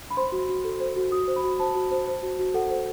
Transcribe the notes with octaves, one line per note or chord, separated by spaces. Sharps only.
B5
C5 C6
F#4
F#4
A4
C5
F#4
F#4 D#6
C5
B5
F#4
C5 A5
F#4
C5
C5
F#4
F#4
A4 F#5
C5